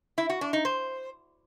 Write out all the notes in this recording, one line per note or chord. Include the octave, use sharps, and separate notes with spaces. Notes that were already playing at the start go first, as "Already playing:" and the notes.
E4
F#4
D4
D#4
C5